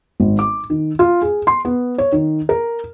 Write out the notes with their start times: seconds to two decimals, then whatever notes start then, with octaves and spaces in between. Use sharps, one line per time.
0.20 G#1
0.39 D6
0.70 D#3
0.99 F4
1.22 G#4
1.47 C6
1.65 B3
1.98 C#5
2.12 D#3
2.49 A#4